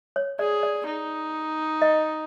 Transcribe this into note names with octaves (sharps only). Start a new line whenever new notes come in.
C#5
G#4 D5
D5
D#4
D#5